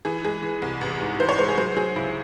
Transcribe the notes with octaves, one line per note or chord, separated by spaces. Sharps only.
E3 G#4
G#3 G#4
E3
C2
A1
G#2
E3 C5
C#5
G#3 C5
G#4
F#3 C5
F#3 G#4
C#2 E4